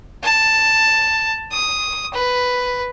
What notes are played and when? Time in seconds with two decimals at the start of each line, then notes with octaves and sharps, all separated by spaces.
0.23 A5
1.51 D#6
2.13 B4